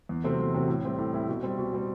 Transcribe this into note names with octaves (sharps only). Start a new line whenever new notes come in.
E2
C3 F#3 A3 C4
E2
C3 F#3 A3 C4
A2
G3 C4 E4
A2
G3 C4 E4
B2
G3 C4
B2
G3 C4